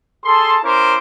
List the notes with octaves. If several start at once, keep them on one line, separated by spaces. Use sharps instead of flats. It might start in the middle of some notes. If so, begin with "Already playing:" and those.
G#4 A4 A5 C6
C#4 E4 A#4 C5 D6